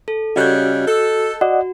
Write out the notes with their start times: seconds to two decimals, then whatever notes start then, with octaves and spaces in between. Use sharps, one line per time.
0.08 A4
0.36 C#3 G3 C#4 F#4 D#5 F#6 G6
0.87 A4
1.41 F#4 D5 D#5 F#5